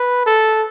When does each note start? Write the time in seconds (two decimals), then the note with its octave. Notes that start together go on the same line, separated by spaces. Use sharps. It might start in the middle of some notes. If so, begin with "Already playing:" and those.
Already playing: B4
0.26 A4